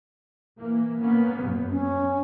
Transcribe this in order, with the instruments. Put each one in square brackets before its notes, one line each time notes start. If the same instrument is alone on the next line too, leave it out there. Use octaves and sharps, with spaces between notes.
[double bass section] E3 A#3
A#3 B3 C#4
F#2
[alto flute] C#4